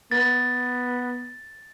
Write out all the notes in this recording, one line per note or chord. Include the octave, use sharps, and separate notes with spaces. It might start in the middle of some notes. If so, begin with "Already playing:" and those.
B3 A6